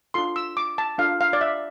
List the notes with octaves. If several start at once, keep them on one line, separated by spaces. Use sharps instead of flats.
D4 F4 A4 C6
E6
D6
A5
D4 F4 A4 F5
F5
D5
E5